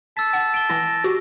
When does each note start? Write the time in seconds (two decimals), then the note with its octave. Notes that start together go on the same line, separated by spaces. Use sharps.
0.17 A5 E6 B6
0.33 F#5
0.54 D7 G7
0.69 E3 E4 A#6
1.04 F#4 G4